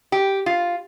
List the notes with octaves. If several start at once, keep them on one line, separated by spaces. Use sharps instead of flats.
G4
F4